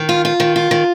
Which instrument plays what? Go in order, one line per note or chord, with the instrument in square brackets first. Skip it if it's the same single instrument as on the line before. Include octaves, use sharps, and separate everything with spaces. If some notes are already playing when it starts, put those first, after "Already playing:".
Already playing: [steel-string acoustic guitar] D#3
F4
F4
D#3
F4
D#3